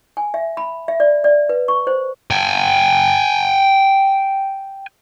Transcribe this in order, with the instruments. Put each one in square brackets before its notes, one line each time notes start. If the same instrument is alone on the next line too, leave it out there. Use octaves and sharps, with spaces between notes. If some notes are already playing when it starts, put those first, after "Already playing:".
[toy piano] G#5
E5
B5
E5
D5
D5
B4
C#6
C5
[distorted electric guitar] G5 G#5